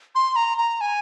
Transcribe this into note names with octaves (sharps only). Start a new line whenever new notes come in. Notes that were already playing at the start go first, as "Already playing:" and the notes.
C6
A#5
A#5
G#5